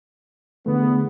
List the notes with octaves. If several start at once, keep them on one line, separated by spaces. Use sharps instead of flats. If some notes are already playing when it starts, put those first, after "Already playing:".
E2 D3 A3 B3